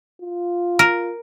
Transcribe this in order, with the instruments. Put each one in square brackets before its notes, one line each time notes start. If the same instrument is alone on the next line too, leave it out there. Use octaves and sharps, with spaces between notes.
[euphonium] F4
[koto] A#4